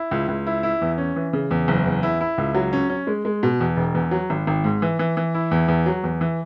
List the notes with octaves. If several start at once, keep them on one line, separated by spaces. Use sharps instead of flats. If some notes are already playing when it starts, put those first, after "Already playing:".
Already playing: E4
C#2
C#2
E4
E4
E2
C#4
E3
C#3
E2
F#1
E2
E4
E4
C#2
F#3
C#4
C#4
G#3
G#3
B2
E2
E1
E2
F#3
G#1
G#1
G#2
E3
E3
E3
E4
E2
E2
F#3
E2
E3